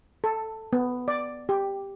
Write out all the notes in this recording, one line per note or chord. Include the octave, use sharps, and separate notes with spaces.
A4
B3
D5
G4